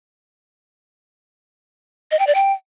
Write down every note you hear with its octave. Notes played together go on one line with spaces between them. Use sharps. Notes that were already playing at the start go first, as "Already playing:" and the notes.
D#5
G5
D5
G5